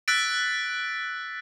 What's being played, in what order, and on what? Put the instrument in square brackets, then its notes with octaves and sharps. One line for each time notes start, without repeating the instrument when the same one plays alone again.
[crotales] E6 F#6 A6 B6 D7